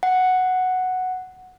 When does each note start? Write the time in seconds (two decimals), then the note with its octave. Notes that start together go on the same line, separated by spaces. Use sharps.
0.03 F#5